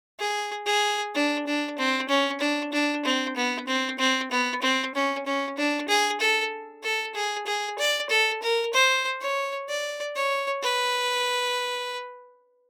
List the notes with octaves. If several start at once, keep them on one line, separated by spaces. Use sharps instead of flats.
G#4
G#4
D4
D4
C4
C#4
D4
D4
C4
B3
C4
C4
B3
C4
C#4
C#4
D4
G#4
A4
A4
G#4
G#4
D5
A4
A#4
C5
C#5
D5
C#5
B4